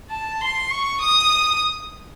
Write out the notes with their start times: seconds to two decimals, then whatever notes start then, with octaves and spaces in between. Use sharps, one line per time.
0.10 A5
0.41 C6
0.70 C#6
1.02 D#6